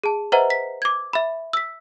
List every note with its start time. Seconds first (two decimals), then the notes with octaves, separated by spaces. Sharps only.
0.04 G#4 A5
0.32 B4 C5 D#5 E5 F#5 A#5
0.50 B6
0.82 D6 G#6
1.13 E5 B5
1.53 E6 B6